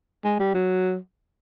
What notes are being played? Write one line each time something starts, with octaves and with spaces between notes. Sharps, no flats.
G#3
G3
F#3